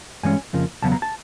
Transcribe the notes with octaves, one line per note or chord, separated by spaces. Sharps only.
G2 E3 G#3 C#4 G#5
F2 C#3 F3 A#3
E2 C#3 F#3 B3 A5
A#5
A5